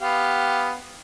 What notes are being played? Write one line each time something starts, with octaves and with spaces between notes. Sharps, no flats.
B3 G4 F5